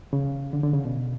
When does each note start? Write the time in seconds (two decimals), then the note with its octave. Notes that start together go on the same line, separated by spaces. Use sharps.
0.13 C#3
0.53 D3
0.63 D3
0.74 C#3
0.85 B2